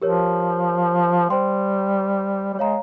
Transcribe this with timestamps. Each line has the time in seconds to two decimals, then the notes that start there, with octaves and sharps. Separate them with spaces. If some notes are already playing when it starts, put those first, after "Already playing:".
0.02 F3 G4 A#4 C#5
1.30 G3 C5 G5 C6
2.54 G3
2.58 G#3 C#5 F5 A#5